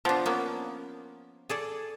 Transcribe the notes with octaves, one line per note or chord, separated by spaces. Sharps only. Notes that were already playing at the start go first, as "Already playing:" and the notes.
F3 B3 D4
A#3 B3 C#4
G#4 A4 D5